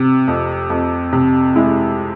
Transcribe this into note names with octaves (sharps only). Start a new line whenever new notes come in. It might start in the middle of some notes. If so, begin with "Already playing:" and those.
Already playing: C3
F2
F2
C3
G#3 E4